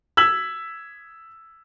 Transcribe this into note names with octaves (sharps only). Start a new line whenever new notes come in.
E6 G#6 B6 F#7